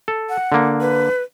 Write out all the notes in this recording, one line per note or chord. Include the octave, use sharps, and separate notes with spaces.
A4
F#5
D3 A#3
B4